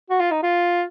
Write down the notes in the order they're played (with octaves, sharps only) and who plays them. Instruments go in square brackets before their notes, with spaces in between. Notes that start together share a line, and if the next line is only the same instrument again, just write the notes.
[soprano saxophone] F#4
F4
D#4
F4